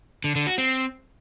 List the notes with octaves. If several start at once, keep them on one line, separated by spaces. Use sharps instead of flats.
D3
D3
F#4
C4